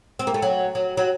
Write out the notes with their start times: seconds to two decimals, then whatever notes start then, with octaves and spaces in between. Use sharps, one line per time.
0.19 C4
0.27 A#3
0.34 A3
0.42 F#3
0.75 F#3
0.97 F#3